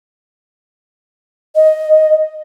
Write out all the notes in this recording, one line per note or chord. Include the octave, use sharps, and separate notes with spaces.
D#5